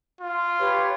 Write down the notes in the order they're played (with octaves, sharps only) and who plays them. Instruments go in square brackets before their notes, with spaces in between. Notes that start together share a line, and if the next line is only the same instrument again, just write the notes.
[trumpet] F4
[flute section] G4 B4 C#5